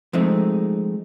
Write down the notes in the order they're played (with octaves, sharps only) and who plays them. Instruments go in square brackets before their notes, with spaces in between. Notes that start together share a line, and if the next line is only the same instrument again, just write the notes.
[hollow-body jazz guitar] F3 G#3 A3 C4 D#4